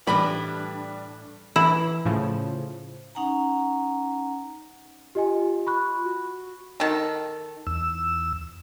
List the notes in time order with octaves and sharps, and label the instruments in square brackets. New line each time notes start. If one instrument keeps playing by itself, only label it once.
[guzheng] A2 E3 D4 [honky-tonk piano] G3 [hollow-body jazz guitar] B5
[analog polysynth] E3 [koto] E4
[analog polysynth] A2 C#3 F3
[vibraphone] C#4 D#4 F#5 G#5 A#5
[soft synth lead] F4 [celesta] G4 D#5 G#5
[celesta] B5 C#6 F#6
[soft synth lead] F#4
[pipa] D#3 A4
[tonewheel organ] E2 E6